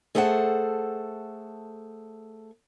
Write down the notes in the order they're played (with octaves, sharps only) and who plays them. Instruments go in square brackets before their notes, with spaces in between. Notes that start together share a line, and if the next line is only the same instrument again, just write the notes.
[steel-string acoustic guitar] A3 G#4 A4 C5 E5 F#5